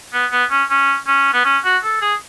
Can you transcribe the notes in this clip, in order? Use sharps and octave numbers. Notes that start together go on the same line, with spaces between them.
B3
B3
C#4
C#4
C#4
B3
C#4
F#4
A4
G#4